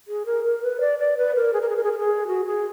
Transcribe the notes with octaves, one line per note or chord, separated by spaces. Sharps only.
G#4
A#4
A#4
B4
D5
D5
B4
A#4
G#4
A#4
G#4
A#4
G#4
A#4
G#4
F#4
G#4